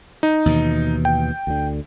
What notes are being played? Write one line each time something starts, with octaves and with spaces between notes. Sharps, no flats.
D#4
D#2 B2 E3
G5
D2 D3